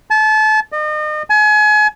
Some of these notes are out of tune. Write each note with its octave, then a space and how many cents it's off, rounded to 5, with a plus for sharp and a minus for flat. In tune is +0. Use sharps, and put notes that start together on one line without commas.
A5 -30
D#5 -40
G#5 +35